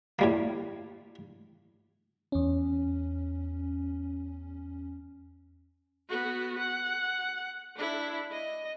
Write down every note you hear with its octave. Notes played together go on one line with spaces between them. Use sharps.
A2 G3 A#3
E2 C#4
B3 F#4
F#5
D4 E4
D#5